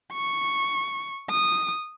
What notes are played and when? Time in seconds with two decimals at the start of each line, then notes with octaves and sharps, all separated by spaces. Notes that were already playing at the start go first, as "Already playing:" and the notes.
0.14 C#6
1.30 D#6